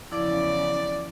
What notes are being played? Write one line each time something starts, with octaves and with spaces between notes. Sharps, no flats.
E2 C#3 F3 E4 D5